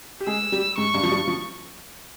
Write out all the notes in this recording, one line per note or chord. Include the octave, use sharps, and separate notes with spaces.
G4
G#3 G#4 E6
G3 G4
G#2 G#3 C#6
G2 G3
F3
G2 G3
F3